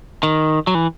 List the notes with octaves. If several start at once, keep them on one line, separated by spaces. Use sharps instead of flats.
D#3
F#3
E3